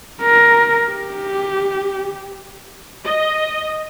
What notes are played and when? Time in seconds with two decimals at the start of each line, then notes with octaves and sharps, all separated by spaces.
0.22 A#4
0.91 G4
3.04 D#5